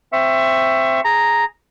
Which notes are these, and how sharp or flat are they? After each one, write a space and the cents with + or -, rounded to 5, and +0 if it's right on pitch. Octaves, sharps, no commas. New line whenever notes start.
C4 +0 E5 +15 C#6 +0
G#4 +0 A#5 +0